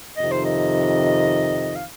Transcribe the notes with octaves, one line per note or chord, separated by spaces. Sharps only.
F2 C3 D#3 D#5
C5
D#5
F5